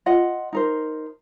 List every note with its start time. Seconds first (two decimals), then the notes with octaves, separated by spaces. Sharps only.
0.06 F4 D#5 F#5
0.53 D#4 A#4 C5